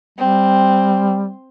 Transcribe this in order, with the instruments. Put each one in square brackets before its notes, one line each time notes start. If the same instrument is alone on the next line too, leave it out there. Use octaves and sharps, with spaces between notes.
[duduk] G3 [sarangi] C4